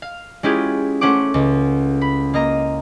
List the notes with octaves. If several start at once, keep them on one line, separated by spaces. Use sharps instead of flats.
F5
G#3 C#4 E4 F4 G4 G#4
A3 C#4 C5 F#5 D6
C#2
B5
A#3 D#5 A#5